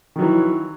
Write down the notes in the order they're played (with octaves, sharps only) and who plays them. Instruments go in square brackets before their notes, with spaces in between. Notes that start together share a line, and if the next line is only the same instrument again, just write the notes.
[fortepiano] D#3
F#3
E3